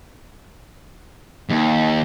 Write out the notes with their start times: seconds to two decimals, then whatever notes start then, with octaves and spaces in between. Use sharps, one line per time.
1.50 D#2